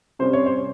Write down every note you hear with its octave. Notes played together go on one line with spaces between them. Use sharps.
C3 G3 C#4 C5
C#5
C5